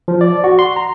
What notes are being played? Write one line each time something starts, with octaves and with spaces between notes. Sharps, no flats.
F3
D5
F#4
C6
A#5